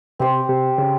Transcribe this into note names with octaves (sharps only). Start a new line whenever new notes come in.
C3 C4 G4 C5
C3
C#3